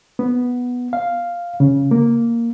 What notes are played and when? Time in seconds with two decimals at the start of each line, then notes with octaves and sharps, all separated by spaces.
0.19 B3
0.93 F5
1.60 C#3
1.91 A#3